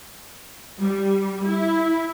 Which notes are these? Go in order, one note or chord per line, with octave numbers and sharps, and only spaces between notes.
G3
E4